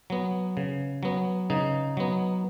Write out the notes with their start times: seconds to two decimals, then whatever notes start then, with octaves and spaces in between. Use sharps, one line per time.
0.10 F#3 B3
0.57 C#3
1.03 F#3 B3
1.50 C#3 D#4
1.97 F#3 B3